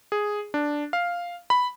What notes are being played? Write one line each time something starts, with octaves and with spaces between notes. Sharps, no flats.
G#4
D4
F5
B5